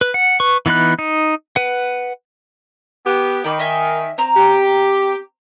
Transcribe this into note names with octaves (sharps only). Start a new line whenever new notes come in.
B4
F#5
B4 C#6
E3 B3 D#4 B5 F#6
D#4
B4 F#5
B3 G4
D#3 G5 B5 D6
D#5 E5 G#5
C4 A#5 E6
G4